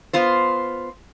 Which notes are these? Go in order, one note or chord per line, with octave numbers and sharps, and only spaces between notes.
B3 F4 C5